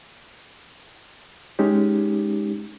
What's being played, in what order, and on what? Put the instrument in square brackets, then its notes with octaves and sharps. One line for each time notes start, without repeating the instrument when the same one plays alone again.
[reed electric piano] G#3 C#4 D#4 G4